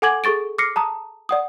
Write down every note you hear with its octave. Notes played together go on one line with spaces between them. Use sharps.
A4 F#5 G#5 D6 G#6 F#7
G#4 A4 C#6 A6 D7
D6 F6 A#6 C7 C#7
A5 A#5 D#6
D5 F#5 D#6